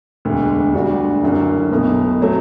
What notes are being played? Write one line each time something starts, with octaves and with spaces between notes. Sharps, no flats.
E1 D2 D3
D2 D3 G3 D4 F#4
F#1 F#2 D3
B1 B2 A3
B2 F#3 A3 C4